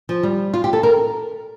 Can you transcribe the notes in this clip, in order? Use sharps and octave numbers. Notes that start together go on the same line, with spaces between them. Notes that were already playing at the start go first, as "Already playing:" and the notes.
F3
G3
F4
G4
A4
A#4